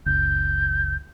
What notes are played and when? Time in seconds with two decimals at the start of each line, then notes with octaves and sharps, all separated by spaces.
0.06 F#1 C#2 G6